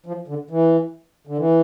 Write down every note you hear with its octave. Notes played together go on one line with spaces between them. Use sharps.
F3
D3
E3
D3
E3